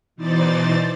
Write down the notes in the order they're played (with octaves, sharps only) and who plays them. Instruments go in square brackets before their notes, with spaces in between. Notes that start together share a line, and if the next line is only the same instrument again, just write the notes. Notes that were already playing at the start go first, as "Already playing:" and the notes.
[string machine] B2 E3 D#4 C5 D5 A6